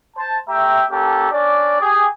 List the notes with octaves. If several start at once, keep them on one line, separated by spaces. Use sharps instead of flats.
C5 A5
A3 G4 E5 G5 A#5
A#3 C#4 G4 A4
C#4 D4 D5
G4 G#4